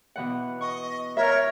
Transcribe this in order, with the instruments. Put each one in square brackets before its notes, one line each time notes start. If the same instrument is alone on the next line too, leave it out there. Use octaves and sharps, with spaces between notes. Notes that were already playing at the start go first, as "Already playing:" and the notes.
[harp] B2 E3 F#5
[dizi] D#5 [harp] C#6
[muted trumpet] A#4 [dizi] C#5 [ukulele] E5